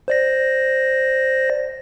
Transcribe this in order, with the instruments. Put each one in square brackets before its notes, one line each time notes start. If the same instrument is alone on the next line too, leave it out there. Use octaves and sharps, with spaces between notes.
[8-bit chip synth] C5 D5 A#6